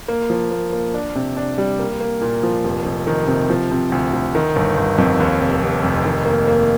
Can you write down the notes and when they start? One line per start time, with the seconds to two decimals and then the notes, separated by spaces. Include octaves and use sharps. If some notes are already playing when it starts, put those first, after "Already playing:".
0.08 A#3
0.30 F3
0.51 A#3
0.73 A#3
0.94 D4
1.15 C3
1.37 D4
1.58 G3
1.79 A#3
2.00 A#3
2.21 A#2
2.43 F3
2.64 F1
2.85 F1
3.07 D#3
3.28 C3
3.50 F3
3.71 C3
3.92 D2
4.13 D2
4.35 D#3
4.56 G1
4.77 G1
4.98 F2
5.20 D#2
5.41 F1
5.62 F1
5.84 F1
6.05 D#3
6.26 A#3
6.47 A#3